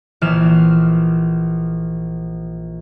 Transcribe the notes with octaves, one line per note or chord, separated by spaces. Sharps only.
A#1 E3 F6 E7